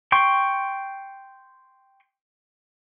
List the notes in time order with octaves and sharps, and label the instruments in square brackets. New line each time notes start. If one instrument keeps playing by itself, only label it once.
[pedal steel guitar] G5 C6 C#6